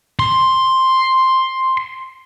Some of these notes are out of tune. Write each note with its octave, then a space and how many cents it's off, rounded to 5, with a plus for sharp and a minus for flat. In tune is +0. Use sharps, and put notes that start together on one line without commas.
C6 +5